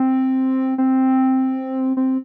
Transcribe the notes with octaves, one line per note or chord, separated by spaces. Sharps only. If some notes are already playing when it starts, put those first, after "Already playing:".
Already playing: C4
C4
C4